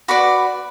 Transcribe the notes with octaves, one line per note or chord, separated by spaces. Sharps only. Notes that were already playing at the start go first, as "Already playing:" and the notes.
F#4 B4 D5 B5 D6